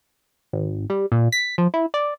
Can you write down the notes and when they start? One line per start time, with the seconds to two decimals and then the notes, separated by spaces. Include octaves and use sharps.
0.53 G#1
0.90 G3
1.12 A#2
1.32 B6
1.58 F3
1.74 E4
1.94 D5